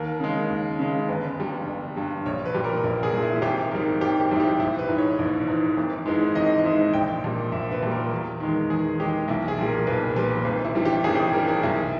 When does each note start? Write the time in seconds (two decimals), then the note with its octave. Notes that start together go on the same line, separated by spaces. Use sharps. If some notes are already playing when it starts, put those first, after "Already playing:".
Already playing: D#2 A#4
0.20 C#3 G#3
0.50 D#2
0.79 C#3 G#3
1.09 G1 B4
1.38 G2 G3
1.67 G1
1.96 G2 G3
2.26 A#1 C#5
2.45 B4
2.54 A#2 G3
2.64 A#4
2.84 A#1 A#4
3.03 G#4
3.13 A#2 G3
3.22 E4
3.36 E4
3.42 G#1 G4
3.71 G#2 G3 A#4
4.01 G#1 G4
4.20 G4
4.31 G#2 G3 E4
4.40 G4
4.59 A#1 E4
4.79 B4
4.88 G#2 E3
4.98 C#5
5.19 A#1
5.48 G#2 E3
5.77 G#1
6.06 G#2 E3 G#3
6.35 G#1 D#5
6.64 G#2 E3 G#3 E5
6.94 A#1 G5
7.24 A#2 G3
7.52 A#1 E5
7.72 B4
7.83 A#2 G3
7.92 A#4
8.11 E2
8.40 D#3 G#3
8.70 E2 G#4
8.99 D#3 G#3 G4
9.28 B1 E4
9.48 G#4
9.58 A#2 G3
9.68 A#4
9.86 B1 B4
10.16 A#2 G3 B4
10.45 G#1 B4
10.65 E4
10.75 G2 E3 G3
10.85 G4
11.04 G#1 G#4
11.15 G4
11.20 G#4
11.33 G2 E3 G3 A#4
11.48 G#4
11.63 B1 E4